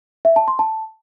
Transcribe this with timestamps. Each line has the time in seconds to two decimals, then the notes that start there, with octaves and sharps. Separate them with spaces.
0.25 E5
0.36 A5
0.48 C6
0.59 A5